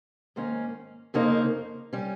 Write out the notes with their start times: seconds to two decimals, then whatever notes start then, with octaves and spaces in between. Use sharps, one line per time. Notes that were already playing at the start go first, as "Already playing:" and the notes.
0.36 G#2 D#3 A#3 C#4
1.14 F2 C#3 F3 A#3 D#4
1.93 G3 C#4